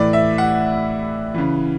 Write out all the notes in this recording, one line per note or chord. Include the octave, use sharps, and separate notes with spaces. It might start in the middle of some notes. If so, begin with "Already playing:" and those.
Already playing: A2 E3 D5
E5
F#5
C#3 E3